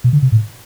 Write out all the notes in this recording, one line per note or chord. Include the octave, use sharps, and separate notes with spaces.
B2
D3
C3
A2